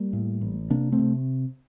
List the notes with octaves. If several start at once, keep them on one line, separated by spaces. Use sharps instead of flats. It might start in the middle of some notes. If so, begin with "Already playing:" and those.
Already playing: G3 A#3
A2
A1
C3 A#3 D4
A3 C4
C3